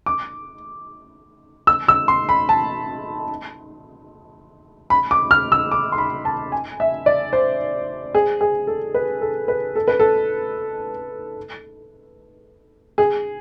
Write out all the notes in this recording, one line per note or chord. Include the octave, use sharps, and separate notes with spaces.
D6
E6
E6
C6
B5
A5
B5
D6
F6
E6
D6
C6
B5
A5
G#5
E5
D5
C5
G#4
G#4
A4
B4
A4
B4
A4
B4
A4
G#4